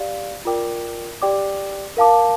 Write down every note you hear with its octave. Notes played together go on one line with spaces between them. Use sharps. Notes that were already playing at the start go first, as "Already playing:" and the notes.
Already playing: G4 D5 F5
F4 A#4 D5 G5 D6
G4 D5 G5 D6
A#4 F5 A5 D6